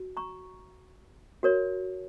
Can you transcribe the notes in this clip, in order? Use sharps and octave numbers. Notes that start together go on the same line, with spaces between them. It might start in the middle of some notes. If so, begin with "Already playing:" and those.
Already playing: F#4
A#5 C#6
F#4 A#4 C#5